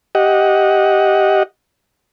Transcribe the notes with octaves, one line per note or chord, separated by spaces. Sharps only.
G4 D#5 F#5